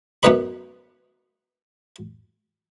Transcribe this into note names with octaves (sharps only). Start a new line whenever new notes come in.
F#2 B3 D#4 B4 D#5 B5